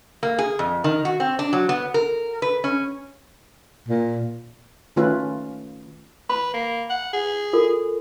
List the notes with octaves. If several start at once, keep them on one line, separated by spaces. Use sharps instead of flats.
A#3
G#4
F2
D#3
F#4
C4
D4
F#3
B3
A#4
B4
C#4
A#2
D#3 A3 C#4 F4 B4
B4 B5
A#3
F#5
G#4
F4 A4 A#4